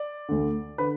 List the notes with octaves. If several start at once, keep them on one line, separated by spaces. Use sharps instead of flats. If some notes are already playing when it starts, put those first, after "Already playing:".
Already playing: D5
D2 D3
D3 B4